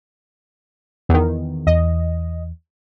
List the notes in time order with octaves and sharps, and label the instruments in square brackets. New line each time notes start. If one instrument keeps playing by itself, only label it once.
[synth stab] E2 D#3
[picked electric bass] E2 [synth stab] D#5